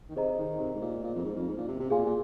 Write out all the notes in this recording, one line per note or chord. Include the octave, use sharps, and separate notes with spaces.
D#3
C3 G#4 C5 D#5 A#5
D#3
C3
G#2
A#2
A#2
F2
G#2
F2
G#2
A#2
C3
C3
A#2 G#4 F5 G#5 C6
A#2